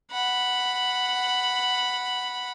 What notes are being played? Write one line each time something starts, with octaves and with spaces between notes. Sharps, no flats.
F#5 B5